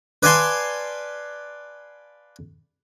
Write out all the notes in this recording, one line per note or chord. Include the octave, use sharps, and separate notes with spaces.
B4 D5 F5 G#5 A5 C6